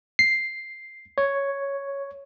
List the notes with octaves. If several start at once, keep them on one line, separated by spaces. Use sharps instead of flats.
C7
C#5